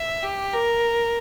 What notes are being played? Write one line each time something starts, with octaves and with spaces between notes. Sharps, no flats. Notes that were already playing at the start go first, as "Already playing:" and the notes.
Already playing: E5
G4
A#4